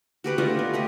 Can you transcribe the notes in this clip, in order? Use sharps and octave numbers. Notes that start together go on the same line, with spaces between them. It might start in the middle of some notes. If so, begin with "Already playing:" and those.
F#4 G4 B4 F#5
A3 D4 F4 D#5
B3
A3 G4 D#5